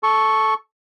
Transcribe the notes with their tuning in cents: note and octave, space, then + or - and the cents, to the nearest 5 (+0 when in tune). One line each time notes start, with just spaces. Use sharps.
A4 -10 C#6 +0